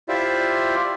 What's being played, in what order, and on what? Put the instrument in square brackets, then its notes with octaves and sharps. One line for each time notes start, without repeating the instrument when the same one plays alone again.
[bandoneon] E4 F4 G4 C5 D5 E5